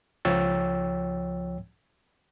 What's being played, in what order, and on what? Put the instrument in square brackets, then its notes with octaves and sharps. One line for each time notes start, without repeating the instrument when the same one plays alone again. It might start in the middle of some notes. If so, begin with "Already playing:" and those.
[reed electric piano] C#2 F3 C#5 G5 E6 A6